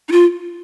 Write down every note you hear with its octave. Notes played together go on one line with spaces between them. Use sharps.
D#4
F4